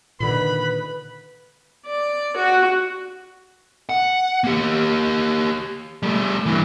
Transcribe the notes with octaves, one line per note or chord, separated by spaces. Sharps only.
A#2 D3 D#3 B4 B5
D5
F#4
F#5
A#3 G4
G3 A3
G2 E3